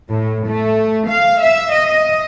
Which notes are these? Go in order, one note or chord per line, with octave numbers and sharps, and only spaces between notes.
A2
A3
F5
E5
D#5